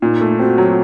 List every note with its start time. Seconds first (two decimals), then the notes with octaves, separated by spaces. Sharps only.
0.02 A#2 D#4
0.21 A3
0.39 C4 F#4
0.58 F#3